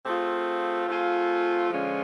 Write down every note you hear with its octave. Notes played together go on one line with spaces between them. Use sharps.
A3 C4 F4 G#4
A3 C4 F4 G#4
D3 F3 G#3 C#4 F4